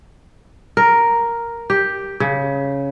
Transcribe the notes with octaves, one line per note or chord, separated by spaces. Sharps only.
A#4
G4
C#3